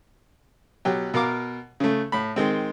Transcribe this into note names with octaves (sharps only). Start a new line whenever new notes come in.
B2 F#3 G4
B2 A#4 F5 D6
C#3 A3
A2 B5
D#3 G#3 C4